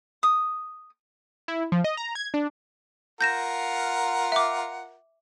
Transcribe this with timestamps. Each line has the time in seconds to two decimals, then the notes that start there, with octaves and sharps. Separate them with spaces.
0.23 D#6
1.48 E4
1.72 F3
1.84 D#5
1.97 A#5
2.15 G#6
2.34 D4
3.21 F4 A#4 F#5 G6 A#6 E7
4.32 E5 D6